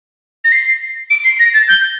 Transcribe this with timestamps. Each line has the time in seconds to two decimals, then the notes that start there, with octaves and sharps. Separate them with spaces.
0.44 A#6
0.52 C7
1.10 D7
1.25 C7
1.39 A#6
1.54 A6
1.68 G6